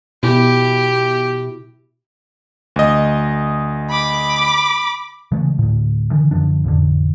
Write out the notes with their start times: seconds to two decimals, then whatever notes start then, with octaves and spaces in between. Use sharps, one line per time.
0.23 B2 E4 G4
2.76 D2 D#5
3.90 B5 D6
5.32 C#3 E3 G#3 A3
5.59 D2 A2
6.11 D3 E3
6.31 F#2 D3 F3 D4
6.64 A1 F2 D3